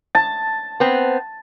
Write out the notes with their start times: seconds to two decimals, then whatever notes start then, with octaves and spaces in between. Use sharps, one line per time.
0.15 A5
0.80 B3 C4